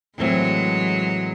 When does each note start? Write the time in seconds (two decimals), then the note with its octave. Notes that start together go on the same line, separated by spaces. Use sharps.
0.18 A2 E3 F#3 G#3 A3 C4